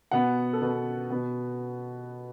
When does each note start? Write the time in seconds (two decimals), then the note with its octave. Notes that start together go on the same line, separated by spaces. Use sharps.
0.11 B2 B3 F#5
0.53 A4
0.62 B2 B3 B4
1.11 B2 B3